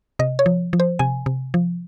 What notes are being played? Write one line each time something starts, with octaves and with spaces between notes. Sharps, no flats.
C3 D#5
C#5
F3
F3
C5
C3 G#5
C3
F3